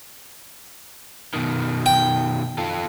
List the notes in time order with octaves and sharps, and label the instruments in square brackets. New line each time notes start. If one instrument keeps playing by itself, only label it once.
[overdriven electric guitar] B2 D#3
[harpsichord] G5
[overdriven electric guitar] F4 A4